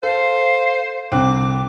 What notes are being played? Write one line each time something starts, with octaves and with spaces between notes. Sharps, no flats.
A4 C5 F5
C2 D3 C4 D6 F#6